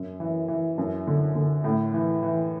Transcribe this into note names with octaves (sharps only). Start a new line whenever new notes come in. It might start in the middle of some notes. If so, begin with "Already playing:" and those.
Already playing: F#2
E3
E3
F#2
D3
D3
A2
E3
E3